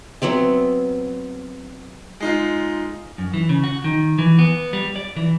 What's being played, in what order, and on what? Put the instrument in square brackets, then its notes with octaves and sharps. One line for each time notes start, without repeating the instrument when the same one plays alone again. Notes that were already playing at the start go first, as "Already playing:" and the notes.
[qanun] F#3 B3 C4 E5
[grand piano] G#3 D#4 F4
[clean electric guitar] F#2
E3
C#3
F#4
D#3
E3
B3
G3
D5
E3